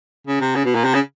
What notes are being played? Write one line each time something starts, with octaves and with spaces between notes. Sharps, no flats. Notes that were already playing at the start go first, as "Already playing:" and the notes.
C#3
C3
C#3
B2
A#2
C3
C#3